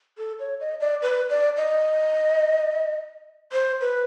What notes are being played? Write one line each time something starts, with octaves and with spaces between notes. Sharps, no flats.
A4
C#5
D#5
D5
B4
D5
D#5
C5
B4